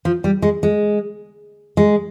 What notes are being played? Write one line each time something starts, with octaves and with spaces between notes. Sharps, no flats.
F3
G3
G#3
G#3
G#3